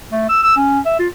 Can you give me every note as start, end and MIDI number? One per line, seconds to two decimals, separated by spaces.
0.12 0.28 57
0.29 0.40 88
0.43 0.55 88
0.57 0.80 61
0.85 0.98 76
0.99 1.08 65